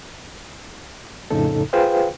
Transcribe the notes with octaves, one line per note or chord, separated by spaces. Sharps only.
F2 A2 C#3 D#4 A4
F4 G#4 B4 C5 F5 G5